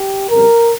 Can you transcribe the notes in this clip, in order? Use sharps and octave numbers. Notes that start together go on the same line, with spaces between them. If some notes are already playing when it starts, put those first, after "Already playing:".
Already playing: G4
F2 C#3 G3 C4 A#4